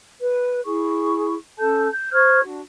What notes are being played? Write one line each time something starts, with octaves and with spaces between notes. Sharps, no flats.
B4
E4 G#4 C#6
C#4 A4 A5 G6
G6
C5 C#6 F6 G#6
D4 F#4